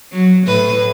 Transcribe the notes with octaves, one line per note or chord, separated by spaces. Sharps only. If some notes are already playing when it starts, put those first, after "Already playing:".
F#3
A2 B4